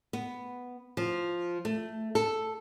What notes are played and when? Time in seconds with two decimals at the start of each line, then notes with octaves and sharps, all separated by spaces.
0.13 B3
0.97 F3
1.65 A3
2.15 A4